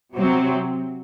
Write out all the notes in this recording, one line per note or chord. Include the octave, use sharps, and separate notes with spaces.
C3 F#3 C4